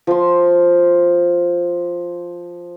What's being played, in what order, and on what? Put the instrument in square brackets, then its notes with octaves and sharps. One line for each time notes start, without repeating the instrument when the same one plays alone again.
[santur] F3 C6